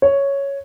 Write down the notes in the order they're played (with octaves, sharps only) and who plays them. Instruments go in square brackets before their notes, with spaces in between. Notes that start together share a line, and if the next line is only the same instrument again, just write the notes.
[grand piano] C#5